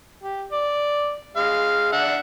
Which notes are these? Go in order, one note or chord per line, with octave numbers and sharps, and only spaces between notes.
G4
D5
G#3 F5
D4 E5 F#5